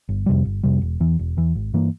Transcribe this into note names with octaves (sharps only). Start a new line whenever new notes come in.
G1
F2 C3 G3
G1
F2 C3 G3
E1
E2 E3
E1
E2 E3
G#1
G2 E3 A#3